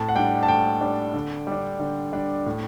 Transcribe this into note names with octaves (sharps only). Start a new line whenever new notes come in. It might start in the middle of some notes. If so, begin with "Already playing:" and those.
Already playing: A2 A5
F#5
G3 D4 G5
A5
A2 G5
G3 D4
D3
G3 D4
D3
G3 D4
A2